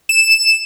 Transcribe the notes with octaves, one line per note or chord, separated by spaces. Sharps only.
E7